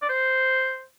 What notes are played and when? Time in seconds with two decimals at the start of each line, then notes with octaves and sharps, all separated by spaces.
0.02 D5
0.09 C5